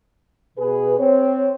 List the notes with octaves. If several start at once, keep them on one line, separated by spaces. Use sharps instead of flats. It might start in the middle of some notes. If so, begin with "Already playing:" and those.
B2 G#4 B4
C4 C#5